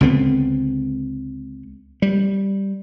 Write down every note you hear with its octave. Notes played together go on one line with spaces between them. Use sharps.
C#2 D3 B3 C4
G3